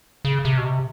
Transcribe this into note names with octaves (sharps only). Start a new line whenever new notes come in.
C#3
C3
B2
C3